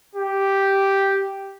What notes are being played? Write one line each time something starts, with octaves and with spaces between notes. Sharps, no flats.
G4